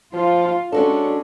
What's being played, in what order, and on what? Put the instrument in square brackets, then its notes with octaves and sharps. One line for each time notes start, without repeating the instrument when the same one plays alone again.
[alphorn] F3 [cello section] F4
[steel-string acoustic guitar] G#3 F#4 A4 [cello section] C#4 [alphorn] D4